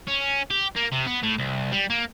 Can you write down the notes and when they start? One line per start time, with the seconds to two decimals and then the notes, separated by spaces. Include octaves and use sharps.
0.08 C#4
0.51 G4
0.76 A#3
0.92 C3
1.06 B3
1.23 A2
1.38 C2
1.72 G3
1.90 A#3